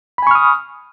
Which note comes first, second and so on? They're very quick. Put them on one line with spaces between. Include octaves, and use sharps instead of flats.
B5 G#5 C#6 F6 D#6